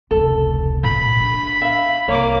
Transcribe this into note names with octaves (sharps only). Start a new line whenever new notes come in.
F1 C#2 A4
A#2 B5
D4
E5 F5
C2 A#3 C#5 D6